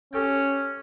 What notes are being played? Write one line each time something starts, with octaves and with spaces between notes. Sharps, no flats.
C#4 G4 A4 G5